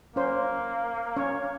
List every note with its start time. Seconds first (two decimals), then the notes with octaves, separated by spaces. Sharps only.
0.16 A#3 C#4 C5
1.17 C#4 C#5